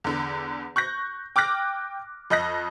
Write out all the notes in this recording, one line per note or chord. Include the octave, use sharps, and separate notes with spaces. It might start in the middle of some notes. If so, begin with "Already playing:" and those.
E2 D3
C#6 F#6 G6 A#6
G5 D6 F6 F#6 A#6
F2 D#5 F#6 A#6